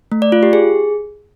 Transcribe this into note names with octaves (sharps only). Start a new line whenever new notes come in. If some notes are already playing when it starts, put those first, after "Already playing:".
A3
D5
F4
G4
G#4